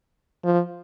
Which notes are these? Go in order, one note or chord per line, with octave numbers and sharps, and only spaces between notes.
F3